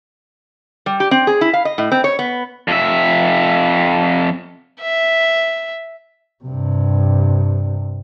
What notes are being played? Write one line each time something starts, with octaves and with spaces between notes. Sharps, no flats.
G3
G4
C4
G#4
E4
F5
D#5
A2
C4
C#5
B3
F2 E5
E5
G2 C3